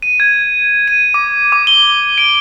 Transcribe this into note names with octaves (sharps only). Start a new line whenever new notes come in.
D#7
G#6
D#7
D6
D6
G7
D7